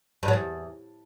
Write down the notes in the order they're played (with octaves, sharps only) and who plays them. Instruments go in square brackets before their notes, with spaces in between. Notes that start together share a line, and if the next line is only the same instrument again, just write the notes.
[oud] G2
F#3
E2